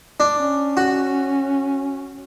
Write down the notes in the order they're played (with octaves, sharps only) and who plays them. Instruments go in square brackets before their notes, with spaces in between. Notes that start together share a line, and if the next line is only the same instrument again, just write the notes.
[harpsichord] D4
[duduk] C#4
[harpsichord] F#4